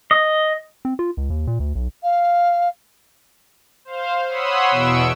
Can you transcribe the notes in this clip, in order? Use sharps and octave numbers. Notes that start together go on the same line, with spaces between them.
D#5
C4
F4
C#2
D#2
A#2
D2
B1
F5
C5 F5
C#5 F#5 B5 C6 D#6 E6
E2 B2 C#6 E6 D7